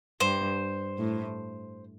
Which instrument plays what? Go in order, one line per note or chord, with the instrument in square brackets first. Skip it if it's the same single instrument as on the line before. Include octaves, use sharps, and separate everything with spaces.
[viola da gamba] G2 [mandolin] C5
[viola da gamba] A2